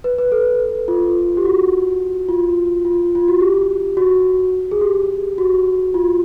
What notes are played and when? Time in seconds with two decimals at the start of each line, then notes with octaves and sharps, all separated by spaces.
0.04 B4
0.18 B4
0.32 A4
0.88 F4
1.37 G4
1.45 F#4
2.29 F4
2.85 F4
3.15 F4
3.28 F#4
3.41 G4
3.97 F#4
4.71 G#4
4.81 G4
5.38 F#4
5.94 F4